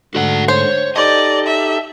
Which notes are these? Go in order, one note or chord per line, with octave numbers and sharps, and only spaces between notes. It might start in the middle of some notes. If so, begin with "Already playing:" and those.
G#2 D3 A3 F#4 D5 F#5
C5 C#5
D#4 G4 A4 D5 D#5
E5